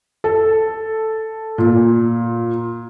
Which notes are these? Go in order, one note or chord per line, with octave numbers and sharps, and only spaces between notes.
A4
A#2